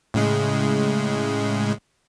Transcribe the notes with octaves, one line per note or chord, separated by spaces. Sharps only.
A2 C#3 G#3